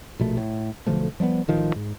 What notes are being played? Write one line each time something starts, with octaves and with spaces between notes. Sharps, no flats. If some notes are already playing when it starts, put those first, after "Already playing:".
A#1 B2 A3
A2
B1 D3 F3 A3
F3 G3 A3 B3
A1 D#3 F3
G#2